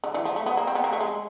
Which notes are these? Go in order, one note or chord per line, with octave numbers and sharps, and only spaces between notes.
D3
E3
F3
A3
B3
A#3
C4
B3
A#3
A3
G#3